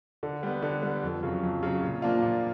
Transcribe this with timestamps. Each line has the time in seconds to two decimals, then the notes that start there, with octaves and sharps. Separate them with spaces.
0.23 D3
0.43 G3 B3
0.62 D3
0.83 G3 B3
1.03 F2
1.23 C#3 F#3
1.43 F2
1.63 C#3 F#3
1.83 A#2
2.02 F3 A#3 D4 F4
2.22 A#2